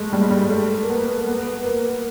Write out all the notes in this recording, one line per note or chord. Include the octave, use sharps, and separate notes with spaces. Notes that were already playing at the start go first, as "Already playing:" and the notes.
Already playing: G#3 A3
G3
G#3
G3
A3
A#3
B3
B3
A#3